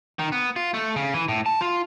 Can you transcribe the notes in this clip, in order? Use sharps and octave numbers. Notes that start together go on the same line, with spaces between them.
D#3
B3
F4
A3
C#3
E3
A2
A5
F4